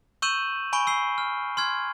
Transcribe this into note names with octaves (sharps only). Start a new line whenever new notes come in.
C#6 E6 G6 D#7 E7 F#7
G#5 B5 C#6 D7 G7
E6 C7 G7
F6
C6 F6 G#6